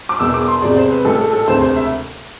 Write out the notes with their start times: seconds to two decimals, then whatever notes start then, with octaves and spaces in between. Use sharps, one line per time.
0.09 D6
0.19 E1 E2 B2 E6
0.34 D6
0.48 C6
0.62 E2 C3 G#3 D5
0.76 C5
0.91 B4
1.05 A1 A2 G#3 A4
1.19 A4
1.33 A4
1.47 E1 D2 C3 G#3 C5
1.61 C5
1.76 E5